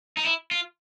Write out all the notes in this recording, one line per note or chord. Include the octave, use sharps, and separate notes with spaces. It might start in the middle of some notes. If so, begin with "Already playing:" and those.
D#4
E4
F4